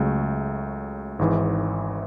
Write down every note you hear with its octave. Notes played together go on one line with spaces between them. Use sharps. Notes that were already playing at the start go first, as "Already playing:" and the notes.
Already playing: C#2 C#3 F#3 A3
G#1 G#2 E3